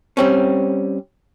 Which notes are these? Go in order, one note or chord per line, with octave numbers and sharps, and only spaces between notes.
G3 C4 C#4